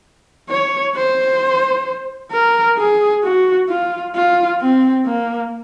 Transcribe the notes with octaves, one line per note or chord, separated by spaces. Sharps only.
C#5
C5
A#4
G#4
F#4
F4
F4
C4
A#3